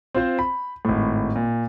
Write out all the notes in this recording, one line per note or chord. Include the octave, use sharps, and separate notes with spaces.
C4 F4 C5
B5
G#1 A2
A#2